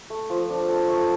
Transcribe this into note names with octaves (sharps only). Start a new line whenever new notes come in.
A3
F3
D4
A4
A3